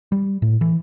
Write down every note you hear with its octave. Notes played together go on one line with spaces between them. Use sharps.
G3
A2
E3